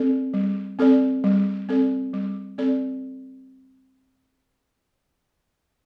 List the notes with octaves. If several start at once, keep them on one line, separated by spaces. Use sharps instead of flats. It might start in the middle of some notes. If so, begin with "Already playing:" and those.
Already playing: C4 A4 D5
G3
C4 A4 D5
G3
C4 A4 D5
G3
C4 A4 D5